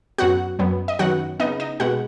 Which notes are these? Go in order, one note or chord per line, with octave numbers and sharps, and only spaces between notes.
F#2 F#3 B3 F#4 F#5
F#2 F#3 B3
D#5
F#2 D#3 F#3 B3 F#4 F#5
C#3 B3 D#4 D#5
D#4 D#5
B2 G#3 B3 F#4 F#5